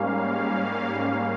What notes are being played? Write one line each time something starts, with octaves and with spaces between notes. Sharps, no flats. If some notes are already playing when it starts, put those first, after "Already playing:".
Already playing: G#2 G3 A#3 C#4 F5